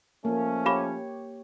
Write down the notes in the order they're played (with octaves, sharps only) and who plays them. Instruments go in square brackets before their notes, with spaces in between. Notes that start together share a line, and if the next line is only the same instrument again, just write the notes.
[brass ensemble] F3 A3 C#4 [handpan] A#3
[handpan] G4 C#5 [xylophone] F5 B5 D6